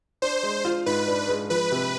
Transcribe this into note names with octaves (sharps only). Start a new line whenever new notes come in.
D4 C5
G#3
F4
G#2 B4
D4
G#3
F3 B4
C3